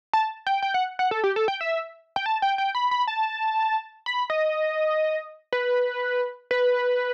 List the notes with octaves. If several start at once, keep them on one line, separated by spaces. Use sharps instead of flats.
A5
G5
G5
F#5
F#5
A4
G4
A4
G5
E5
G5
A5
G5
G5
B5
B5
A5
B5
D#5
B4
B4